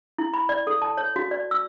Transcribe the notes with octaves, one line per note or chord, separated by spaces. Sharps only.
E4
B5
D5
A4
A5
C#5
F#4
D5
E6